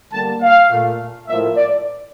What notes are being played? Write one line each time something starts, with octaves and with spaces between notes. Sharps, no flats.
D3 G3 A#3 A5
F5
A#2 A3
A2 F3 A#3 E5
D5